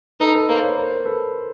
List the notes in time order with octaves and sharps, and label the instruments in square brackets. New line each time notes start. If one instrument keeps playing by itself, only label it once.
[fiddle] D#4 [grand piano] A4 B4
[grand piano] A4 B4
[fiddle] A#3 [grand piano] A#4 C5
[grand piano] B4 C#5
A#4 C5
A4 B4